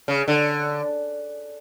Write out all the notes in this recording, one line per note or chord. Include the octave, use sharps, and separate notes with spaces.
C#3
D3